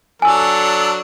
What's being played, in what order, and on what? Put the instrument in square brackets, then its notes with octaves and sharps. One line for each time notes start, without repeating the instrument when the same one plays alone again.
[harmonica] F#3 D4 [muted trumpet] A4 [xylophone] G#5 E6